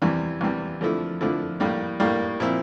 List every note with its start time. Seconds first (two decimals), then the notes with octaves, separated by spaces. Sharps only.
0.02 E2 C3 E3 G3
0.41 E2 C3 E3 G3
0.81 F2 D3 F3 A3 E4
1.21 F2 D3 F3 A3 E4
1.60 A2 G3 A#3
2.00 A2 G3 A#3
2.40 A#2 F3 C4 E4